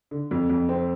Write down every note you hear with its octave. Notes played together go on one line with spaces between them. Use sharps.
D3
F2
F2
C4